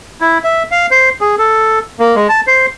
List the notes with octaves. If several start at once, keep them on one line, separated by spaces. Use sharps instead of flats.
E4
E5
F5
C5
G#4
A4
A#3
G#3
A5
C5